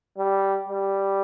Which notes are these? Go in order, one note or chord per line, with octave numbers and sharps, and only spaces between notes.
G3
G3